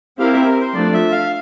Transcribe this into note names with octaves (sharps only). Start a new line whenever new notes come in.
C4 E4 G4 A#4 F5
E5
A#4
C5
F3 A3 D4 D5
E5
F5